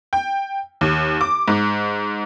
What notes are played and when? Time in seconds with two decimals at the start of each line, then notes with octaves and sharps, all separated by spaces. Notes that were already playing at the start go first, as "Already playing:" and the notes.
0.13 G5
0.81 D#2
1.21 D6
1.48 G#2